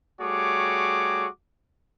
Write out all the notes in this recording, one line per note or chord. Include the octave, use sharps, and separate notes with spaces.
G3 A3 F#4 G#4 C#5 D6